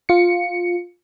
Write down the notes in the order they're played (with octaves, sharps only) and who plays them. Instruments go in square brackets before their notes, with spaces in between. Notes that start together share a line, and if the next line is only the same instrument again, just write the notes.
[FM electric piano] F4 C#7